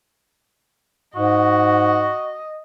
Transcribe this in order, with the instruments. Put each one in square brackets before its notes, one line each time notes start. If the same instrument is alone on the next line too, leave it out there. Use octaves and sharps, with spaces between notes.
[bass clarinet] G#2 [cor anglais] F#4 [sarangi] D#5